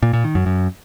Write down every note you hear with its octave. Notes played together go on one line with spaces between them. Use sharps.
A#2
A#2
D#3
F#2
F#2